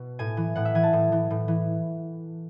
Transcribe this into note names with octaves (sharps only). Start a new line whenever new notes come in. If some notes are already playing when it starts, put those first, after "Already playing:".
Already playing: B2
A2 G#5
E3
A2 F#5
E5
E3 G#5
A5
A2
E3
A2
E3